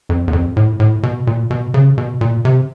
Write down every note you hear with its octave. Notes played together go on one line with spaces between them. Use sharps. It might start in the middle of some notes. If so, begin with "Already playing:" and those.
F2
E2
F2
A2
A2
B2
A#2
B2
C#3
B2
A#2
C3